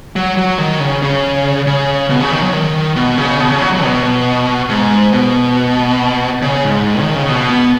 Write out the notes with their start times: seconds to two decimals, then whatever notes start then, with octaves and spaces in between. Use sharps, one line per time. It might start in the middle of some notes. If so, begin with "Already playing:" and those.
0.16 F#3
0.37 F#3
0.58 D#3
0.80 C#3
1.02 C#3
1.67 C#3
2.10 B2
2.21 C#3
2.32 D#3
2.43 F#3
2.53 D#3
2.96 B2
3.18 C#3
3.40 B2
3.50 C#3
3.61 F#3
3.72 F#3
3.84 B2
4.69 G#2
5.13 B2
6.42 C#3
6.64 G#2
7.01 D#3
7.15 C#3
7.29 B2
7.50 B3